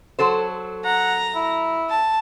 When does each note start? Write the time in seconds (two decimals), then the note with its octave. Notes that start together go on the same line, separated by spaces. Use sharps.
0.19 F#3 A4 C5
0.85 F#5 A#5
1.35 E4
1.90 A5